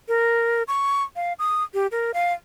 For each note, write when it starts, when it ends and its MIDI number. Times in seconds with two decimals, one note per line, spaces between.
0.08 0.63 70
0.68 1.03 85
1.16 1.33 77
1.39 1.63 87
1.74 1.87 67
1.92 2.11 70
2.14 2.33 77